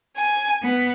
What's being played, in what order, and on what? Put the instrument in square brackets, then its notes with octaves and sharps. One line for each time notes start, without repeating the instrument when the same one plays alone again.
[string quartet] G#5
B3